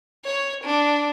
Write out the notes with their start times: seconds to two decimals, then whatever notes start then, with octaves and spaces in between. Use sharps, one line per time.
0.25 C#5
0.64 D4